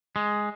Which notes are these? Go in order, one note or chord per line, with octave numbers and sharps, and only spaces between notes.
G#3